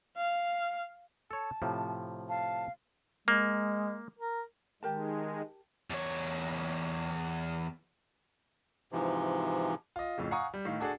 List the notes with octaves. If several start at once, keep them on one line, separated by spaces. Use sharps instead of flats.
F5
A4 C#5 A5
A2 C3 F3
F5 A5
G#3 A#3
A#4
D#3 G#3 G4 A#4 A5
E2 C#5
G#2 C3 E3 F3
F4 D#5
F2 A2 C#3
F5 F#5 G#5 A#5 C#6 D#6
G3
A2 D#3 F5
D4 F#4 G#4 A4 D5